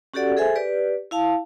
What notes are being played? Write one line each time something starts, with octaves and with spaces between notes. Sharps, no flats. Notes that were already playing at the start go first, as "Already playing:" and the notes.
C#4 F#4 G4 A4 D5 F#5
G#4 A4 C5 E5 G#5
G4 B4 D5
E4 F5 A5